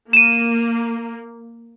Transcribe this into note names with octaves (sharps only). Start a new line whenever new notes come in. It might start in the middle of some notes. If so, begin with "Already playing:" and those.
A#3 D#7 E7